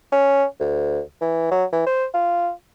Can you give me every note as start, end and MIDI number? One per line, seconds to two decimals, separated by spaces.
0.12 0.45 61
0.60 1.01 38
1.21 1.49 52
1.51 1.65 54
1.72 1.82 52
1.87 2.06 72
2.14 2.51 65